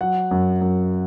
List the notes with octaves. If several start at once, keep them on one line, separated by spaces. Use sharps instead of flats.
F#3 F#5
F#2
F#2